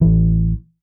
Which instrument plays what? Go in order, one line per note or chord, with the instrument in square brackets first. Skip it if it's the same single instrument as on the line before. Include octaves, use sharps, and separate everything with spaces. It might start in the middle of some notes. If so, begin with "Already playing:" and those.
[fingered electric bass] A1 E3